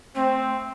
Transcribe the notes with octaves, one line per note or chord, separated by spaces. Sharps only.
A3 C4